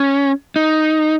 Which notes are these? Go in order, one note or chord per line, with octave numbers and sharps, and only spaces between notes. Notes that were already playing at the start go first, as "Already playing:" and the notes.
Already playing: C#4
D#4